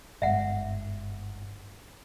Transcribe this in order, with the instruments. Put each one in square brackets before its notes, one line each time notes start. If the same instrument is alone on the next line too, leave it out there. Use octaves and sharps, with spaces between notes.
[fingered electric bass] G1 G#2 [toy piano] E5 F#5